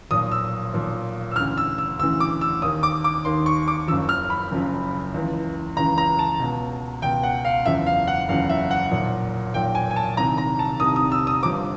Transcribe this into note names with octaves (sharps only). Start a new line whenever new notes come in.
B1 A#2 F3 D#6
E6
B1 A#2 F3
E6
D2 C#3 E3 F6
E6
E6
D2 C#3 E3 E6
D6
E6
D#2 D#3 D#6
D6
D6
D#2 D#3 C6
C#6
D6
F#1 F#2 C#3 F3 E6
F6
B5
F#1 F#2 C#3 F3
C#2 C#3 E3
C#2 C#3 E3 A#5
A#5
A5
C#2 B2
C#2 B2 G5
F#5
F5
F#1 E2 C#3 F3 E5
F5
F#5
F#1 E2 C#3 F3 F5
E5
F#5
B1 A#2 F3
B1 A#2 F3 G5
G#5
G#5
A5
C2 C3 D#3 A#5
A#5
A5
C2 C3 D#3 D#6
D#6
E6
D#6
G1 G2 D3 F3 D6